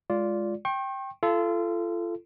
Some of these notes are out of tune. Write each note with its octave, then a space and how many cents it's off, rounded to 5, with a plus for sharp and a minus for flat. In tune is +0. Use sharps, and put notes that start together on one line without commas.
G#3 +0 F4 +0 D5 -20
G5 +0 C#6 -45
F4 -30 A4 -10